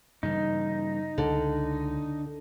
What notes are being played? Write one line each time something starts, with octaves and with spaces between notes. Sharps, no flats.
G2 C#3 E3 D#4
C#2 D3